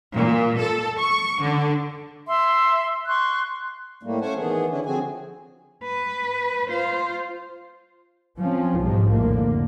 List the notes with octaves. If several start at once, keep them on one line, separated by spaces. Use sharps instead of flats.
A#2
A4
C#6
D3
E5 C6
C6 C#6 F#6
A2 G3 A3 A#3
A3 C#4 C5 F#5 G#5 A5
D#3 E3 B3 G#4
D3 C#4 D4 E4
D3 F3 C4 F#4 G#4 G#5
B4
F4 C5
F3 C4 C#4
B1 G#2 F3 G3
F1 A#1 A2 D3 F3 A#3